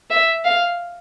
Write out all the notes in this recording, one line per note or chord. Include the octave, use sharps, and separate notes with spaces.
E5
F5